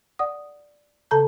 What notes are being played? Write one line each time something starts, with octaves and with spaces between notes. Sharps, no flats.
D5 F#5 D#6
C#3 A4 A5 A#5 G6